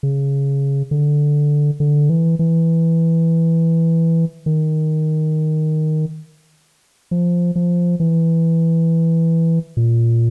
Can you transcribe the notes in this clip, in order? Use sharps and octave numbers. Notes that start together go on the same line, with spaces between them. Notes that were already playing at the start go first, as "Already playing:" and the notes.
C#3
D3
D3
E3
E3
D#3
F3
F3
E3
A#2